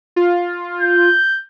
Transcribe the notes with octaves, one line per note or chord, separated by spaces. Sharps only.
F4
G6